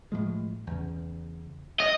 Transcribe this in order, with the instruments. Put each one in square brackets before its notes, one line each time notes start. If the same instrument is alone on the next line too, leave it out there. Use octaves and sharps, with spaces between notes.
[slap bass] A2 F3 G#3
E2 C#3
[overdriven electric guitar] D#5